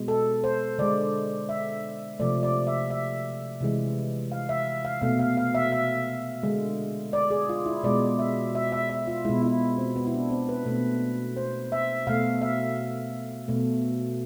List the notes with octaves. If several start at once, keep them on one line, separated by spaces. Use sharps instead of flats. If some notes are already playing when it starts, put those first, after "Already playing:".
Already playing: B2 G#3
A4
C5
D3 G#3 D5
E5
C3 F3 A3 D5
D5
E5
E5
C3 E3 G#3
F5
E5
F5
B2 A3 F5
F5
F5
E5
E5
D3 G#3
D5
G#4
F4
E4
B2 G#3 D5
E5
E5
E5
E5
F4
B2 G#3 E4
E4
C4
B3
E4
D4
C4
B4
B2 A3
C5
E5
B2 A3 F5
E5
B2 A3